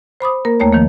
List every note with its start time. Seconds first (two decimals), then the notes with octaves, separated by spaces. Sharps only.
0.21 C5 B5 D6 D#6
0.45 A#3 A#4
0.60 D#2 A3 A#3 C#5 A#5
0.73 D#3 F3 A#3